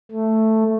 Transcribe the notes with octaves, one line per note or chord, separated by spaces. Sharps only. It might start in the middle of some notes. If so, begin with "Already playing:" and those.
A3